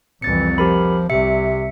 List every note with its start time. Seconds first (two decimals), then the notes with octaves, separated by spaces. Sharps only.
0.22 C2 F2 E3 A6 C#7
0.58 F3 G4 A#4 B5
1.10 C2 C3 E5 C#7